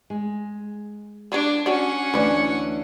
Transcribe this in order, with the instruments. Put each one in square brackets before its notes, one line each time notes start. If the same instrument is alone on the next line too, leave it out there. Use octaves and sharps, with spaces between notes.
[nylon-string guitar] G#3
[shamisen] G3 C#5 D5 [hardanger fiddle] D4
[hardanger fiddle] C#4 F#5 [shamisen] F#4 D5
[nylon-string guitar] D2 E3 D4 [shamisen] B4 D5